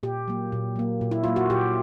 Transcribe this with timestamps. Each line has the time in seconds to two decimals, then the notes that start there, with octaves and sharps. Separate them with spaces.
0.03 A#2 G4
0.28 F#3 A#3
0.52 A#2
0.76 F#3 A#3
1.01 A#2
1.11 E4
1.24 F#3 A#3 F4
1.36 F#4
1.50 A#2 G4